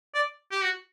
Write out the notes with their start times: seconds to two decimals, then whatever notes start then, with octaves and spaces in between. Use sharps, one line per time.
0.15 D5
0.52 G4
0.63 F#4